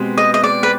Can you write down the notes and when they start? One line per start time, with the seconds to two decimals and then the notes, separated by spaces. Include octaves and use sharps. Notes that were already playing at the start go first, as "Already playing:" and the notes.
Already playing: B2 G#3 C4 G4 B4
0.18 D#5
0.34 D#5
0.44 D5
0.63 B4